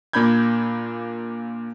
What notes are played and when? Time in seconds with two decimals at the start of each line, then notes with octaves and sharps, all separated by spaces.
0.13 A#2 A#3 D4 B5 G6 G#6